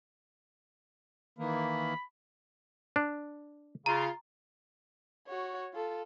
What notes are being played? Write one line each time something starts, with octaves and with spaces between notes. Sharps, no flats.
D#3 E3 A#3 B5
D4
C#3 F4 A#5
F#4 C#5
F4 A4